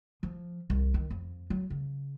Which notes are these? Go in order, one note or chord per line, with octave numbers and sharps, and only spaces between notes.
F3
C2
D#3
F2
F#3
C#3